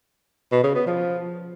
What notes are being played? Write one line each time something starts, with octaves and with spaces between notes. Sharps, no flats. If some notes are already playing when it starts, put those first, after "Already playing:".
B2
C#3
B3
F3